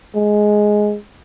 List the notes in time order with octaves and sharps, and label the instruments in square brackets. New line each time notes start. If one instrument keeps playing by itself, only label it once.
[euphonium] G#3